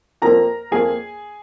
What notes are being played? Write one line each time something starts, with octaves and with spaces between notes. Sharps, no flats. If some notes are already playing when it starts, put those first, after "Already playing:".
F2 F3 A#3 A#4 A#5
F2 F3 A#3 G#4 G#5